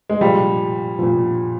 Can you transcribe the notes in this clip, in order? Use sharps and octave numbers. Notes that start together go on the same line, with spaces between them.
G#3
A#2 F3 G3
A#2 F3